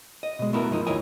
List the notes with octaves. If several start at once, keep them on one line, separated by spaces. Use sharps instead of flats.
D#5
B2 G#3
A3 B3 E4 F#4 A#4
F#2 A2 F3 D#4
D#2 E4 A#4 C#5 D#5 G#5